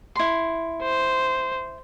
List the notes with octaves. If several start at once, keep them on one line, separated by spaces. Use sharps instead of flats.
E4 C6
C5